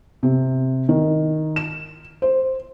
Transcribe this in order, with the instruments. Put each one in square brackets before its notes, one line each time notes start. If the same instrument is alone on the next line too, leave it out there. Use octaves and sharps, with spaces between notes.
[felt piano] C3
D#3
E7
C5